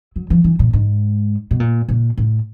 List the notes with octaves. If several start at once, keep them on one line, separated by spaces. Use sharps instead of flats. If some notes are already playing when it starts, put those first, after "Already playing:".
F#3
F3
E3
A#2
G#2
B2
A#2
A#2
A2